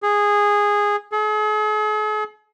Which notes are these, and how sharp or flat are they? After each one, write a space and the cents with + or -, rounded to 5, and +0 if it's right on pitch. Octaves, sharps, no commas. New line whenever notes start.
G#4 -10
G#4 +45